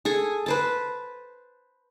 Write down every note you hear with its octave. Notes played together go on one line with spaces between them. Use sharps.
G#4 A4 G#5
B4 C5 A5